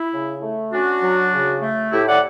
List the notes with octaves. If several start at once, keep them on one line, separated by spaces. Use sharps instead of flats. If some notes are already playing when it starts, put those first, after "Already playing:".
Already playing: E4
C#3
A3
C#4 D4 F#4
F#3
C#3
A3
A2 E4 G4
D5 F#5